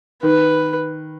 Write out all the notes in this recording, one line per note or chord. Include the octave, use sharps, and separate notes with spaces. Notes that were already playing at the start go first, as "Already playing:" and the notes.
D#3 B4